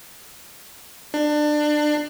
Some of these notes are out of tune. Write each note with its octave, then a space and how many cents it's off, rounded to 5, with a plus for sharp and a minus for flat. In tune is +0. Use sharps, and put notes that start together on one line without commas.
D4 +25